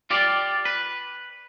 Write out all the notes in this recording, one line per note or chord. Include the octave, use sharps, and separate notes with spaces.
F4 G4 D5
B4